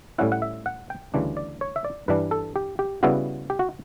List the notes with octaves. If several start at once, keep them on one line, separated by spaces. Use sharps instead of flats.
A2 G3 C#4 E4 F#5
F#5
E5
F#5
G5
D2 C#3 E3 G3 D4
D5
C#5
E5
D5
G2 E3 G3 D4 B4
A4
G4
G4
C#3 G3 B3 E4 F#4
G4
F#4